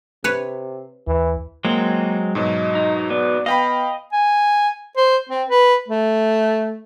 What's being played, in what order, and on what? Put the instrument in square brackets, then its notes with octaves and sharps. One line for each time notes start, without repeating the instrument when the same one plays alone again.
[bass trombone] C3 [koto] B4 C#5
[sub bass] D#2 [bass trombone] E3
[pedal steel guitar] F#3 G#3 C4 [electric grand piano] A#3
[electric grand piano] G#2 B2 F#3 [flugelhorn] D#5
[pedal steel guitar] D#4
[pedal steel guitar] B3 [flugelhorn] D5
[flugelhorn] B3 [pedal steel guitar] D#5 [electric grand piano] F5 G5 B5
[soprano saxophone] G#5
C5
C4
B4
A3